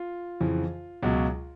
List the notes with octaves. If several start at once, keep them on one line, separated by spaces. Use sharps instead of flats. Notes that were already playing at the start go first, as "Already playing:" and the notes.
Already playing: F4
F2 C#3 E3
C#2 B2 F#3